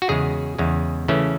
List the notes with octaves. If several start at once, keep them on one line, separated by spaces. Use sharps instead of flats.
F#4
E2 C#3 G#3 G#4
E2 C#3 G#3
C#3 E3 A3 C#4